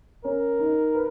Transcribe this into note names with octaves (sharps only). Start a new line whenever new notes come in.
C#4 A#4
D#4
B4